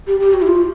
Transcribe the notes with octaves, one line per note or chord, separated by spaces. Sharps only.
G4
G4
F#4
E4
F4